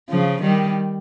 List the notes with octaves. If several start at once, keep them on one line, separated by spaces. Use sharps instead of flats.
C#3 F3
D#3 G3